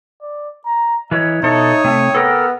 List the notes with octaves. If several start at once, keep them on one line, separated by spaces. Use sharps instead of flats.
D5
A#5
E3 B4 C#5 D#5
B2 D#4 A4 C#5 E5 D#6
C3 A3 G5
B3 A4 A#4